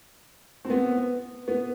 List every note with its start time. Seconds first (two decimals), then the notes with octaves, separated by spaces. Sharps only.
0.65 C4
0.70 B3
1.48 B3